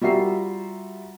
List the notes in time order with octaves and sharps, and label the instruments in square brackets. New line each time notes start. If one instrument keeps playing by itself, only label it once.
[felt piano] G3 F4 F#4 E5 A#5 C7